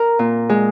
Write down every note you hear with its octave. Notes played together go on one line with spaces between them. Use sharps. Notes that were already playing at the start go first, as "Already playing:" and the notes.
Already playing: A#4
A#2
G#3